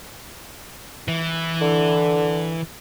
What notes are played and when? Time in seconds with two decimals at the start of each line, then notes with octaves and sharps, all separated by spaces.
1.08 E3
1.61 D3